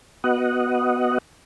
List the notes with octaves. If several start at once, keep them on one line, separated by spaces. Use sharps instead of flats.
B3 F#4 D#5 F#5